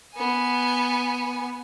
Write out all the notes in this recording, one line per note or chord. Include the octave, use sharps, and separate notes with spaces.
B3 G#5